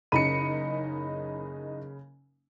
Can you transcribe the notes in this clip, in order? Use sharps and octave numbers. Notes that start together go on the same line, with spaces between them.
F#1 C#3 D#4 B5 C#7 D#7